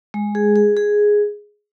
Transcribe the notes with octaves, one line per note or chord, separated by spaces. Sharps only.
G#3
G#4
G#4
G#4